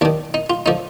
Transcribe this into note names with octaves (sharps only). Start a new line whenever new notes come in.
D#2 D#3 D4
D#4
F4
D3 F3 D#4